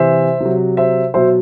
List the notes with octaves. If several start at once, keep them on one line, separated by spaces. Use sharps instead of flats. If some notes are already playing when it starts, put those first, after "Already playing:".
Already playing: C3 E3 C5 E5
C3 F#3
C5 E5
B2 F#3 C5 E5